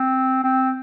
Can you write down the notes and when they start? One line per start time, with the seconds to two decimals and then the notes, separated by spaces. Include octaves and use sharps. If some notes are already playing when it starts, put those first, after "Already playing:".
Already playing: C4
0.44 C4